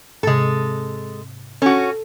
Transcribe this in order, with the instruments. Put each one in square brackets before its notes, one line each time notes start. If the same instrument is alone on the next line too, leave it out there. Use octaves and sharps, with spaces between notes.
[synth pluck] G#2 C3 [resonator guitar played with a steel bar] G#3 A4
[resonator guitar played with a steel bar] C#4 F#4 [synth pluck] A4